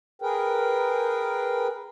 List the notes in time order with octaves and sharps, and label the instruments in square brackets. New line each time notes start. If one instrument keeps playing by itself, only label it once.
[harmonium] G#4 A#4 B4 G5